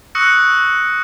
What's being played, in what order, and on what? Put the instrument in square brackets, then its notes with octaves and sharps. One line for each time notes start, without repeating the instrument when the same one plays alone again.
[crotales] C#6 D#6 E6 F#6 A#6 C#7